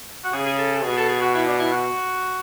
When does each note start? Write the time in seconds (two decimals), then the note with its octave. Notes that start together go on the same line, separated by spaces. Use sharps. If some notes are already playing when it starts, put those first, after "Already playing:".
0.24 F#4
0.33 C#3 G#4
0.46 G#4
0.58 A4
0.72 A4
0.84 B2 G#4
0.97 A4
1.09 G#4
1.21 F#4
1.35 E4
1.47 D4
1.60 E4
1.72 F#4